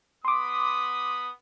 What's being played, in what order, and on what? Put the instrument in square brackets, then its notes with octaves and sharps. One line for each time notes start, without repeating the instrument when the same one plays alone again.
[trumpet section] B3 B5 D#6 [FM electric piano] C6 D6